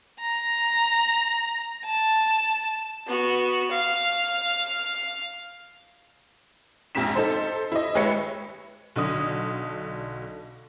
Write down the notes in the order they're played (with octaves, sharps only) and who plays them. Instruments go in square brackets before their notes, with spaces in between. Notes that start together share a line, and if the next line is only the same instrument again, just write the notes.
[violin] A#5
A5
B3 F#4
F5
[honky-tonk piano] A#1 F2 G#2 B6 E7
D#4 A4 C5
E4 D#5
D#2 G#3 B4 C#5 E5 C#7
B1 D3 D#6